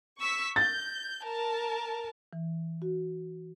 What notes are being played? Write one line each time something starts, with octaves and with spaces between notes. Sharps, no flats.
C#6 E6 B6
G6 A6
A#4 A5
E3
F#4